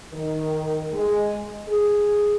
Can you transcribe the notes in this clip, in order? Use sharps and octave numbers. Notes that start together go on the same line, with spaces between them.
D#3
G#3
G#4